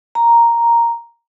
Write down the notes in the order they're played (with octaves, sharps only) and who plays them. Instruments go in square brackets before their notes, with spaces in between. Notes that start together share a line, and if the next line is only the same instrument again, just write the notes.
[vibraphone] A#5